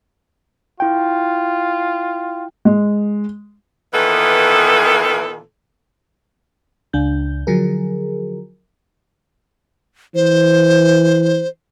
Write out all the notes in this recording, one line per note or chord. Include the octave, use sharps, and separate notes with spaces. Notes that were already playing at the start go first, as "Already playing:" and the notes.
E4 F4 G5
G#3
A#2 D#3 E3 B3 A4
C#2 D4 G6
D3 F3 F#3 G#4 A#4
E3 C5